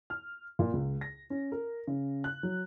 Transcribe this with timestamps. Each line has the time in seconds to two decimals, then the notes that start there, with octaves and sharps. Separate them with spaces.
0.10 F6
0.59 A#2
0.73 C#2
1.01 A#6
1.30 C#4
1.52 A#4
1.87 C#3
2.24 F#6
2.43 F#3